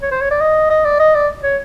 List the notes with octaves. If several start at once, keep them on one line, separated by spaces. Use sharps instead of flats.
C#5
C5
C#5
D5
D#5
D#5
D5
D#5
D5
C#5